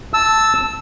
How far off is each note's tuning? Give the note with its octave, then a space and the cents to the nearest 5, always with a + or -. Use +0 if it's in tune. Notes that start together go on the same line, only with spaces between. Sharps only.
A5 +0 E6 -5